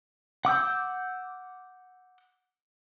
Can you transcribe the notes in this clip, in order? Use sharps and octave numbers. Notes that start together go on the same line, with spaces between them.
F#5 D6 E6 G6